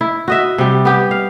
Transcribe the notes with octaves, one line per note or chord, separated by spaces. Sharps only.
E4
F#4 D#5 E5
C3 G3
B3 G4
F5